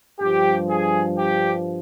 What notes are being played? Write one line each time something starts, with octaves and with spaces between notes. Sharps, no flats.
G2 F3 G4
G#4
G4